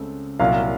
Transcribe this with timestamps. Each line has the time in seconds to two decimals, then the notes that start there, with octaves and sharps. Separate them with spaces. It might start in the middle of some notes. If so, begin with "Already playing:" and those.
Already playing: C#2 C#3 A3 C4
0.40 C2 A#2 F#3 F5